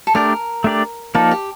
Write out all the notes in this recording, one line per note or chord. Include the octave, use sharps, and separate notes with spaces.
A4
A3 D4 G4 A#4 D5
A3 D4 G4 D5
F3 A#3 D#4 A4 A#4 D5
G4